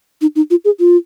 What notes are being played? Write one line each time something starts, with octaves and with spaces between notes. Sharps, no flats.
D#4
D#4
F4
G#4
F4